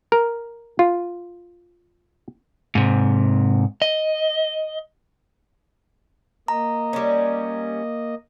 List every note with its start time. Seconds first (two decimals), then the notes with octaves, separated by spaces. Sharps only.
0.12 A#4
0.79 F4
2.75 G#2 C3
3.82 D#5
6.48 A#3 D#5 A#5
6.93 G3 C#4